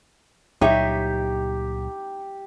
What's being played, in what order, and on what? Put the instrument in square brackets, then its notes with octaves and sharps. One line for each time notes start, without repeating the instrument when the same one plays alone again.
[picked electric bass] C#2 A#2 F#3 [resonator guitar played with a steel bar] D#4 C#5 E5 [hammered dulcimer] G4